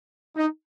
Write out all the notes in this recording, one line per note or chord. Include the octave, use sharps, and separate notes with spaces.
D#4